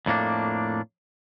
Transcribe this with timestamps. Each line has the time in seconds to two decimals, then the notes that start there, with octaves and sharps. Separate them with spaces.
0.06 F2 A2 A#3 D4